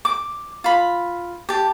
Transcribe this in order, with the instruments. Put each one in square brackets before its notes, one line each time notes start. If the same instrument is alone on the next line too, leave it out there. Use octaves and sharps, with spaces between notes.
[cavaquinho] D6
F4 B5
G4 A5